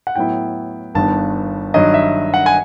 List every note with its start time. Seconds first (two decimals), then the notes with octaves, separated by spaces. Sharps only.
0.07 F#5
0.15 A2 F#3 B3 E4 G5
0.95 G1 G2 D#3 G3 B3 A5
1.74 G2 D#3 F#3 D#5
1.94 E5
2.34 F#5
2.46 G#5